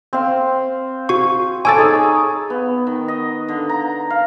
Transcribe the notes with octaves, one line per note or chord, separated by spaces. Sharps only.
C4 F5
F#4 C#6
A4 C#5 G#5 D6 E6 A6
D#4 G#4
B3
D#3
D#5
D3
A#5
F5